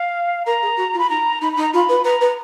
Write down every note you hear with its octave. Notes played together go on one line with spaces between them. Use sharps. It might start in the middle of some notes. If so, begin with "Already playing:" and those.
Already playing: F5
A#4 A#5
G#4
F#4
F4
B5
D#4 A#5
D#4 B5
D#4 B5
A#5
F4 B5
B4
B4 A#5
B4